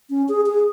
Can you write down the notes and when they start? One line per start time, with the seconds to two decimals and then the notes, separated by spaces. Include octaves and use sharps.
0.10 C#4
0.29 G#4
0.46 G#4